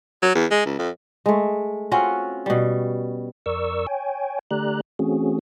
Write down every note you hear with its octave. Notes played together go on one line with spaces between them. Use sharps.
F#3
E2
G#3
C#2
F2
G#3 A3
C4 C#4 F4 F#4
B2 G3
F2 A#4 D5 C#6 E6
C#5 G5 G#5
D3 A3 G4 D5 A#5 F#6
E3 A3 C4 C#4 F#4 G#4